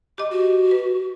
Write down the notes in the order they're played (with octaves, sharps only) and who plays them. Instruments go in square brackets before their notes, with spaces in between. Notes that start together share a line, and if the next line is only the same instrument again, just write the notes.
[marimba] G4 D#5 [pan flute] D6
[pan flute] F#4
[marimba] B4